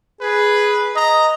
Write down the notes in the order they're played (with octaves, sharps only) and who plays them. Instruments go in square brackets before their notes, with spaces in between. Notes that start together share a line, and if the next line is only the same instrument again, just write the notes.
[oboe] G#4 [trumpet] B4
[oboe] D#5 [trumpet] A#5